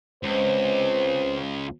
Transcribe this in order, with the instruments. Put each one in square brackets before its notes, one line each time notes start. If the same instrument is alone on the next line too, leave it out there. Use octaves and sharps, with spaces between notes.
[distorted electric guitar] C#2 [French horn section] C4 B4 C5